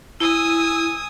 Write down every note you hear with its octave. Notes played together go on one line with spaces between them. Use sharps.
E4 G#5 D#6 E6